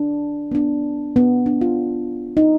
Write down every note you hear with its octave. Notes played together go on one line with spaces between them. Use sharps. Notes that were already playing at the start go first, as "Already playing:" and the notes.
Already playing: D4
B3
D4
B3
D4
F4
D#4